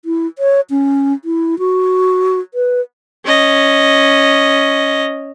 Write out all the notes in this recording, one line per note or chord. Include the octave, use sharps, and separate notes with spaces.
E4
C#5
C#4
E4
F#4
B4
C#4 D#5